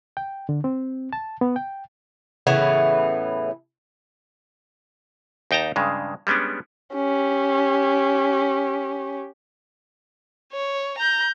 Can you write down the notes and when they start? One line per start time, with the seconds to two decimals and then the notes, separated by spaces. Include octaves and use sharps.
0.17 G5
0.49 D3
0.64 C4
1.13 A5
1.41 B3
1.56 G5
2.47 A2 C#3 E3 B3
5.51 D#2 D#4 G5 A5 A#5
5.76 G2 C#3 G#3
6.27 G3 G#3 B3 C#4 D4
6.94 C#4 G4
10.53 C#5
10.99 A#5 G6